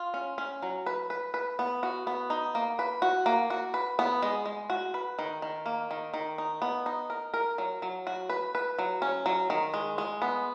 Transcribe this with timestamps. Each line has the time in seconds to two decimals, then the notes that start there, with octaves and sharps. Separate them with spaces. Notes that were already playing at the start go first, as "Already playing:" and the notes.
Already playing: F4
0.14 C#4
0.38 C#4
0.62 F#3
0.86 B4
1.10 B4
1.34 B4
1.59 B3
1.83 F#4
2.07 B3
2.30 D#4
2.55 A#3
2.79 B4
3.02 F#4
3.26 A#3
3.50 F#4
3.74 B4
3.99 B3
4.22 G#3
4.46 G#3
4.70 F#4
4.94 B4
5.19 D#3
5.42 D#3
5.66 A#3
5.91 D#3
6.14 D#3
6.38 D#4
6.62 B3
6.86 D#4
7.10 A#4
7.34 A#4
7.58 F#3
7.82 F#3
8.07 F#4
8.30 B4
8.55 B4
8.79 F#3
9.02 C#4
9.26 F#3
9.50 D#3
9.74 G#3
9.98 G#3
10.22 B3